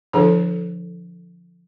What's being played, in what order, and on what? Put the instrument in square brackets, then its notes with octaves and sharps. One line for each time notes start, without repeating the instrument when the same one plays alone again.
[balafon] D3 F3 D4 G#4 A4 C#5